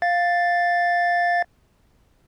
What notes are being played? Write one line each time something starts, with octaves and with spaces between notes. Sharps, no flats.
F5 A6